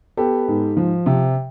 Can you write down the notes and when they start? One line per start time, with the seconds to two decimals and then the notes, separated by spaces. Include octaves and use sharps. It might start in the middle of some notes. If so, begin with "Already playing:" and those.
0.17 B3 G4 A4
0.48 G#2
0.77 F3
1.06 C3